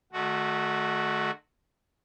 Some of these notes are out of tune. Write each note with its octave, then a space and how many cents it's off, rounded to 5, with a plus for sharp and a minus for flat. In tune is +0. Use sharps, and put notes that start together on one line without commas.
D3 +45 A3 -30 F#4 +0